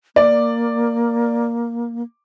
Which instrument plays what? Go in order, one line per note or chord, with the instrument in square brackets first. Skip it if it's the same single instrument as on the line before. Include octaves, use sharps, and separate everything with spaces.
[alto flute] A#3 [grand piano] D5